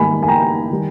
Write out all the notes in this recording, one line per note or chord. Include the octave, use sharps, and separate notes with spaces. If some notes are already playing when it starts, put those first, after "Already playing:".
Already playing: G#2 D#3 G3 A#3 G#5 B5
G#5
G5 A#5
D#3 G3